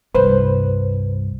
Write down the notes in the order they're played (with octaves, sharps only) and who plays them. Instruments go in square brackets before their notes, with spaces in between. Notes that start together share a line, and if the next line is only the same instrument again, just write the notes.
[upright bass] C2 G2 [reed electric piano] B4 C5